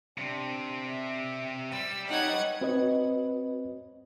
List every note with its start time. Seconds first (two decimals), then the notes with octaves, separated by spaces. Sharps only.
0.18 C3 C4 D4
0.88 E5
1.73 G3 E6
2.08 D#4 C#5 F#5 G#6
2.61 C4 F#4 B4 C#5 D#5